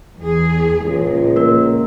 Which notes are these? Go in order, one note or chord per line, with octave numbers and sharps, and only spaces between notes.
E2 G#4
C#2 A#2 F3
A#3 A#4